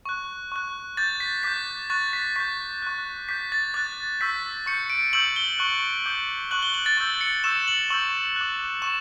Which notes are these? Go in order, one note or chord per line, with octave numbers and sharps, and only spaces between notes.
C#6 F#6
C#6 F#6
D6 G6 A6
B6
D6 G6 B6
C#6 F#6 A6
B6
C#6 G6 B6
C#6 F#6
D6 G6 B6
A6
D6 F#6 A6
C#6 E6 G6 B6
C#6 G6 C#7
D7
C#6 E6 G6 F#7
G7
C#6 F#6
D6 G6
C#6 F#6 F#7
G7
F#7
A6
C#6 E6 G6 A6
C#7
C#6 E6 G6 E7
F#7
C#6 E6 G6 F#7
D6 F#6
C#6 E7